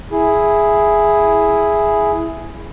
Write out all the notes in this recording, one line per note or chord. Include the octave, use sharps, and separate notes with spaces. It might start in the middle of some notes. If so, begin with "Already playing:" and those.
E4 G#4